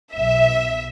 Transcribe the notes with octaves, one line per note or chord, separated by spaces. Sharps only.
B1 E5